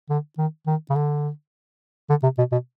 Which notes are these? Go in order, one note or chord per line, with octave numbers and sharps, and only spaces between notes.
D3
D#3
D#3
C#3
D3
D3
C3
B2
B2